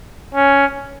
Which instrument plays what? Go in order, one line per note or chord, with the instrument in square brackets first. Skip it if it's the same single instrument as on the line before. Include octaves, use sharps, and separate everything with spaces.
[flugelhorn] C#4